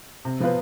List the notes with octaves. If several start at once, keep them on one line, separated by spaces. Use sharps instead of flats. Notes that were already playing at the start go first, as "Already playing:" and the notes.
C3
F3 B3 F4 B4